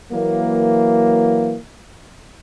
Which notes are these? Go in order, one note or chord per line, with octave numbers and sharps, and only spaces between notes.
E3 F#3 A#3